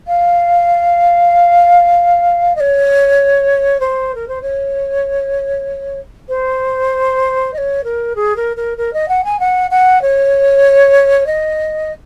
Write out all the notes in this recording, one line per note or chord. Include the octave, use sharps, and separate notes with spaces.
F5
D#5
C#5
C5
A#4
C5
C#5
C5
D#5
C#5
A#4
G#4
A#4
A#4
A#4
D#5
F#5
G#5
F#5
F#5
C#5
D#5